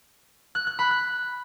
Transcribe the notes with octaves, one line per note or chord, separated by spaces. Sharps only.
F#6
F#6
B5
F#6